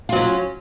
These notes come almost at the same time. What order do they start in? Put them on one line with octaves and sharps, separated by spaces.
F4 F#3 C#4